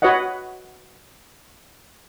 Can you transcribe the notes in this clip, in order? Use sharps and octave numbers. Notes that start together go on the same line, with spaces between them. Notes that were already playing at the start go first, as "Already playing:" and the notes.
F#4 B4 C#5 D#5 F#5